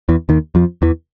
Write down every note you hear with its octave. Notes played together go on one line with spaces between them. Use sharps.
E2 E3
D#2 D#3
F2 F3
E2 E3